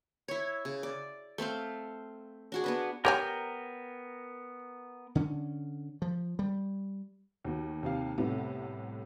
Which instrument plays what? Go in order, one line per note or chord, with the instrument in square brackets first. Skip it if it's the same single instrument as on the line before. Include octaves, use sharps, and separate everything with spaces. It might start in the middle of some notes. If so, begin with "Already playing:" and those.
[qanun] E4 C#5
C#3
D5
A3 C4 C5 F5
D4 F#4 G#4
B3 D4 B4
[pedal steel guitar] B3 A#4 G5 [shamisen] G4 C#5 G#5
[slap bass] D3 C#4
F3
G3
[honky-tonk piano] D#2 B3 F#4
D#2 C3 F5
C2 A2 C3 A3 B3